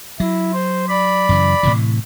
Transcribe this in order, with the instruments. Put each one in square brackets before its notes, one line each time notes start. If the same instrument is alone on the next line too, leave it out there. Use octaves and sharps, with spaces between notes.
[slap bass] F#3 [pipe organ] E4
[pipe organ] C5
D5 B5
[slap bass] F#2 C#3 E3
A2 C3 E3